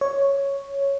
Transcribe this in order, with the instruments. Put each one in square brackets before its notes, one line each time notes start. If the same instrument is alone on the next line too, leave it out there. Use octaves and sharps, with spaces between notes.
[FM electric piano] C#5